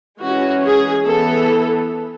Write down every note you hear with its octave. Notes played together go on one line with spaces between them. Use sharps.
E3 G#3 C#4 F#4
G#4
E3 B3 A4